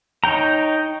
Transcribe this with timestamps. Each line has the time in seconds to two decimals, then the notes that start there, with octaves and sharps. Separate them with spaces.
0.24 D#4 C#5 G5 A#5